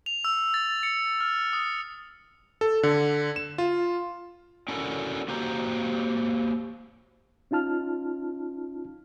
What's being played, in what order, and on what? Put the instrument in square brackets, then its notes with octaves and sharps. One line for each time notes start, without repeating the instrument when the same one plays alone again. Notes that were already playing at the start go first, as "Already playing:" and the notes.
[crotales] F7
E6
A6
C#7
F6
D#6
[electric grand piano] A4
D3
E7
F4
[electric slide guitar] C#4 D4 E4 F#4 A4 A#4
A#3 F#4 G4 C5 A#5
[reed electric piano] C#4 D#4 F4 A5 F6